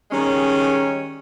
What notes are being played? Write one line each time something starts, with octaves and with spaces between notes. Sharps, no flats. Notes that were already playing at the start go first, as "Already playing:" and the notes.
D#3 G3 G#3 C#4